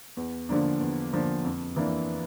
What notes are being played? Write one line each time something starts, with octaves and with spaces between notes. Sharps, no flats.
E2
D3 F3 A#3 D4
E2
D3 F3 A#3 D4
F2
E3 A#3 D4